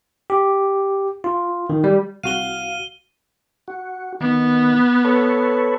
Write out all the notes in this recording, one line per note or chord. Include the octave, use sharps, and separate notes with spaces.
G4
F4
D#3
G3
C2 F#4 F5 D#7 G7
F#4
D#3 B3
A4 B4 C#5